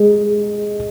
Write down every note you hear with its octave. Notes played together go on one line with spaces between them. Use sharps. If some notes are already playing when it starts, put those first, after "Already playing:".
Already playing: G#3